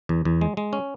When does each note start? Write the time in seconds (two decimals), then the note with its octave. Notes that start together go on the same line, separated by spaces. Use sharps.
0.09 E2
0.25 E2
0.41 G#3
0.57 G#3
0.73 C#4